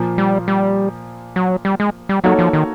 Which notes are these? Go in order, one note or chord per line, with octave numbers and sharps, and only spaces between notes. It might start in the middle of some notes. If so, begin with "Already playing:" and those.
Already playing: A#2 F3 A#3
G3
G3
F#3
G3
G#3
G3
F#3 A#3 D#4 F#4 A4 C#5
F3
D#3